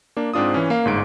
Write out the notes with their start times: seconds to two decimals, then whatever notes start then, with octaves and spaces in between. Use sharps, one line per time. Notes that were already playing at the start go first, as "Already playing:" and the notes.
0.16 A#3 D4
0.34 G#2 C4 D4 F4 D#6
0.54 E3 C#4
0.70 A#3 F5
0.85 G1 G#2 D7